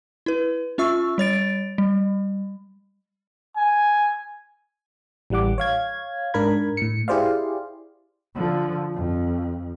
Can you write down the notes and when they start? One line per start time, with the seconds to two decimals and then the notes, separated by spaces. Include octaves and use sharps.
0.26 E4 B4
0.78 C#4 F4 E5 C#6 E6
1.18 G3 C#5 A6 D7
1.78 G3
3.57 G#5
5.30 A1 E3 G3 F#5 D6
5.58 C#5 F5 G#6
6.34 G#2 D4 A#4 B5 G#6
6.77 A2 C#7
7.08 E4 G4 G#4 C5 D5 F5
8.36 D3 F3
8.94 F2